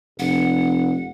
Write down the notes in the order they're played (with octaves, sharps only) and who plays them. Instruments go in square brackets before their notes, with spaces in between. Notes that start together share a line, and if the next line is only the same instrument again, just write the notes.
[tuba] F1 [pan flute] F#5